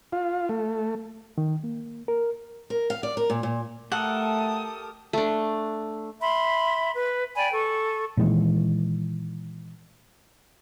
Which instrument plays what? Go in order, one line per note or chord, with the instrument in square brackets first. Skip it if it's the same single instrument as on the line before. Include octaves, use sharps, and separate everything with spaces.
[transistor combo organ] F4
A3
[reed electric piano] D#3
A#3
A#4
[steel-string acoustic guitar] A#4
F5
D5
A#4
A#2
A#2
[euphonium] A3 [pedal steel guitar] G4 A4 A#4 [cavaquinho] F#5 [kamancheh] A5 D#6
[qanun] A3 D4
[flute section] E5 B5 C6
B4
D5 G5 G#5 B5
A4 C#6
[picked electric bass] A#2 D#3 E3 G#3